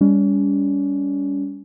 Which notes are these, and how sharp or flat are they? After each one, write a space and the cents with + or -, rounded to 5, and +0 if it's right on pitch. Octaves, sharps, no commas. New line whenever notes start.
G3 +30 C#4 +35